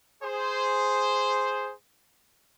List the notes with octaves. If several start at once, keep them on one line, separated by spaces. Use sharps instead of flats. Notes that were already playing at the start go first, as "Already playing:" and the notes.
G#4 C5